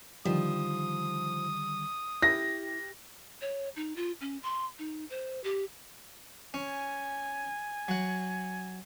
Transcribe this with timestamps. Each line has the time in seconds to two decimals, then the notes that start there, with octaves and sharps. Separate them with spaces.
0.25 D3 D#3 F3 G3 D#6
2.22 E4 G4 A#6
3.41 C#5
3.76 D#4
3.96 F4
4.21 C#4
4.43 C6
4.79 D#4
5.10 C5
5.44 G4
6.54 C#4 G#5
7.88 F#3 F#5